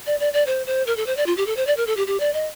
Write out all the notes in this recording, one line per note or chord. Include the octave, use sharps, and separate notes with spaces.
D5
D5
D5
C5
C5
A#4
A4
C5
D5
F4
G4
A4
C5
D5
A#4
A4
G4
G4
D5
D#5